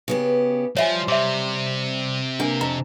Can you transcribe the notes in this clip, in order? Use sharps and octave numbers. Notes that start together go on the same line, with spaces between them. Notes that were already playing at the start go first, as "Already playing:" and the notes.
C#3 B3 G4
F3 G3 C5 C#5 E5 G#5
C3 E5 D6
A#3 D4 G#5
F2 A#5